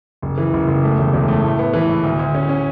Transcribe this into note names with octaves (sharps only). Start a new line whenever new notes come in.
F#1
E3
F#1
F#1
A3
E1
E1
A3
A2
B3
E3
A2
D2
D2
C#4
C#4